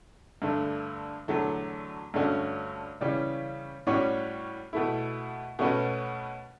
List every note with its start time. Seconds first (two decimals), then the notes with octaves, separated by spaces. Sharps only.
0.42 G2 D3 A3
1.28 E2 D3 F#3 A3
2.14 G2 D3 A3 C#4 F#4
3.01 C#3 E3 G3 C#4
3.87 A2 G3 C#4 F#4 C#5
4.73 B2 A3 E4
5.59 B2 A3 C#4 F#4 B4